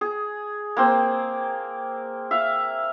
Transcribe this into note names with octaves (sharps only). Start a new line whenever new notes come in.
G#4
A#3 C4 C5
E5 F5